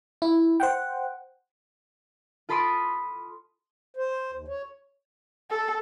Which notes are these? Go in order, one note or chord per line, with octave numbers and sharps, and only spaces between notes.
E4
C5 F#5 G5
F4 A4 B5 C6 D#6 D7
C5
D#2
C#5
A4